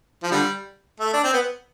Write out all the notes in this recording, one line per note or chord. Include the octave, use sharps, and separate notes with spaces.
F3
D3 G3
A3
D4
C4
B3